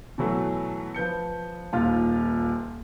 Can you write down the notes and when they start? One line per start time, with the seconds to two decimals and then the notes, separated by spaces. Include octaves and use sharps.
0.18 B2 E3 F#3 A3
0.95 F3 B4 G6 C#7
1.73 D#1 D#2 F4 F6